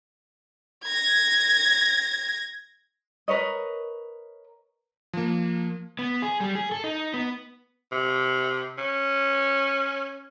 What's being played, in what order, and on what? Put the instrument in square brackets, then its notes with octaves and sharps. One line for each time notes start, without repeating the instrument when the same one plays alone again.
[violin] G#6 A#6
[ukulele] A#4 B4 C#5 D#5
[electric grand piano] F3 A#3
[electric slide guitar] B3
G#4
G3
G#4
A4
D#4
B3
[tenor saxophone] C3
C#4